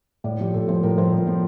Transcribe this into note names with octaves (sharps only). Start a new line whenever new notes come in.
A2 D5
F3 G4
A2 A4
F3 C5
A2 A#4
F3 C5
A2
F3